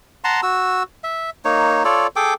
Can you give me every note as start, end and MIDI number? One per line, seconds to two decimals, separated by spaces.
0.24 0.41 78
0.24 0.41 81
0.24 0.41 82
0.24 0.41 84
0.43 0.83 66
0.43 0.83 88
1.04 1.30 76
1.45 1.83 58
1.45 1.83 63
1.45 1.83 73
1.85 2.07 65
1.85 2.07 69
1.85 2.07 73
1.85 2.07 74
2.16 2.34 68
2.16 2.34 69
2.16 2.34 79
2.16 2.34 86